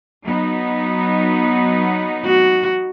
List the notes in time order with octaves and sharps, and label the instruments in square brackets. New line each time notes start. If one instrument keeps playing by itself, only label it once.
[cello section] F#3 B3 D#4
[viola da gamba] F#4